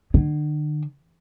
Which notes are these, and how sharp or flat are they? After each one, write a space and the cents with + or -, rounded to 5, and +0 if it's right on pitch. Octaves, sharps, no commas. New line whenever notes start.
D3 +40